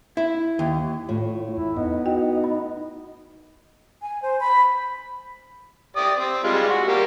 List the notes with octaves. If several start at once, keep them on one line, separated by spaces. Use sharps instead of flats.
E4
D#2
A2 A3 F4 C#5
E2 E4
B3 D#4 D#5
F#4 G5
B5
G#5
C5
B5
G4 D5 D#6
C4
G3 G#3 F4
F#4
G3 A#3 G4